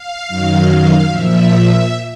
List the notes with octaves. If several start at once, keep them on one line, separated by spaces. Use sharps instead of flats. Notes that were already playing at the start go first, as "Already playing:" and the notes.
Already playing: F5
F#2 D#3 F#3
F5
A#2 F3 E5